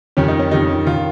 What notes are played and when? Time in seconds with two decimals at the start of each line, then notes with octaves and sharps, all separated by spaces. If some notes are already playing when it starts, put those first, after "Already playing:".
0.17 F2 D#3 G3 C#4
0.28 D#4
0.39 C#4
0.51 F2 D#3 G3 D#4
0.86 D#3 F4